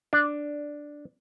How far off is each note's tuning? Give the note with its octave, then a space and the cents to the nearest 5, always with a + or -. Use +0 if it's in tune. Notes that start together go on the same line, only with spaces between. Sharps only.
D4 +0